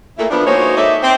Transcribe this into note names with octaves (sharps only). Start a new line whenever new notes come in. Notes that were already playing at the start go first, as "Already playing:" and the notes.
A#2 A3 E4
F3 B3 D4
G#3 A#3 D#4 F#4 C5 C#5
D#4 A4 D5 E5
C4